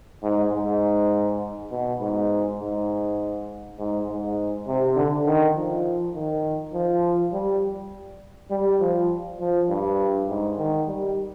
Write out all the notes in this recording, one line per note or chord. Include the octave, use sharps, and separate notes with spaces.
G#2
G#2
B2
G#2
G#2
G#2
G#2
C3
D3
D#3
F3
D#3
F3
G3
G3
F3
F3
G2
G#2
D#3
G3